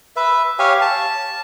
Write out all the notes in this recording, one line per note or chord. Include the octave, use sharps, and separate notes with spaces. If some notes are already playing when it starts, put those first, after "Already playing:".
B4 E5
G4 C#5 F5 G#5
A5